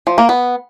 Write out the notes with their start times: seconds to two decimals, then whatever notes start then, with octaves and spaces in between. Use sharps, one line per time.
0.07 F3
0.18 A#3
0.29 B3